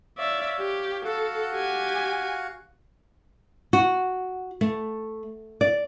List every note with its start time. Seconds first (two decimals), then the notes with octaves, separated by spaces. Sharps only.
0.18 C#5 D5 E5 F5
0.60 G4
1.05 F#4 A4 F5 F#5
1.53 G4 G#5
3.73 F#4
4.61 A3
5.61 D5